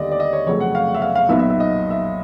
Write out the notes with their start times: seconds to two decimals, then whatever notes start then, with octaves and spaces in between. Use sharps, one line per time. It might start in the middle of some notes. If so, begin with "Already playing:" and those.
Already playing: D#2 D3 G3 D5 D#5
0.12 D5
0.20 D#5
0.33 C#5
0.46 F1 F2 C#3 F#3 A3 C#5
0.60 F#5
0.75 F5
0.88 F#5
0.94 E5
1.02 F5
1.15 F5
1.29 B1 A#2 F#3 B3 D#4 E5
1.39 E5
1.50 E5
1.60 D#5
1.90 E5